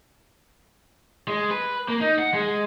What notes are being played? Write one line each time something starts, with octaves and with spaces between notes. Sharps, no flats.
G#3
B4
A#3
D#4
F#5
G#3